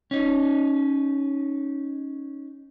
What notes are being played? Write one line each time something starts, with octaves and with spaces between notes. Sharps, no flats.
C#4 D#4